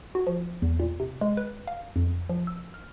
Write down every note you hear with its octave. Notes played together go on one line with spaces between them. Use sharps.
F#4
F3
E2
A#2
C3
G#3
B4
F5
F2
F3
E6
F6